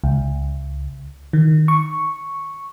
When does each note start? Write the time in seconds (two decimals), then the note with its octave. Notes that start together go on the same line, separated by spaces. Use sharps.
0.04 C#2
1.33 D#3
1.68 C#6